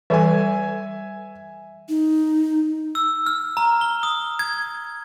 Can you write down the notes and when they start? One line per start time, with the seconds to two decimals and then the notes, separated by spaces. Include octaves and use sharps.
0.10 E3 G3 A4 E5 G#5
1.89 D#4
2.95 E6
3.27 F6
3.57 A#5
3.81 G7
4.03 D#6
4.39 G#6